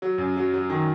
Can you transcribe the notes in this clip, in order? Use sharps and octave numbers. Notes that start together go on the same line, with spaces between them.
F#3
F#2
F#3
F#3
D#3